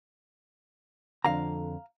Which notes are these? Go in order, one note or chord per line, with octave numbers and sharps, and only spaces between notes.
F2 D3 F5 A#5